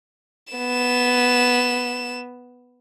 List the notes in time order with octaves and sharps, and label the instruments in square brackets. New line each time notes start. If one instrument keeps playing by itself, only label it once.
[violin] B3 E7